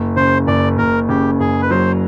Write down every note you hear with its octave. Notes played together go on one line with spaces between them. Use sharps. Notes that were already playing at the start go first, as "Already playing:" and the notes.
Already playing: F#1
C#3 C5
F#1 D5
F#1 A#4
C#3 G4
F#1 G#4
B4
F#3 C5